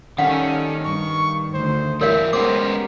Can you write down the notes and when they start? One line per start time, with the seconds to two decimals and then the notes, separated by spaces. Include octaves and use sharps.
0.18 D#3 G3 C#4 A4 F5 F#5
0.85 G2 C#6
1.54 D2 C5
2.01 E3 G3 A#4 C#5 E5 F5
2.33 G#3 B3 C#4 G4 A#4 C5 D6